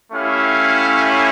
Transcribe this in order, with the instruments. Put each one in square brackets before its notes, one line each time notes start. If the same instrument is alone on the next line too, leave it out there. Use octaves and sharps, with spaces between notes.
[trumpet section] A3 C#4 E4 G4 F5